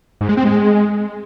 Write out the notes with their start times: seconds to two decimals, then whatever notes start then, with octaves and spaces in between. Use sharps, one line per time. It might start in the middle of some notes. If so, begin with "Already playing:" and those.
0.21 G#2
0.29 G#3
0.37 C4
0.45 G#3